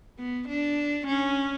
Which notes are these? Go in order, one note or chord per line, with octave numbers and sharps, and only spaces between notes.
B3
D4
C#4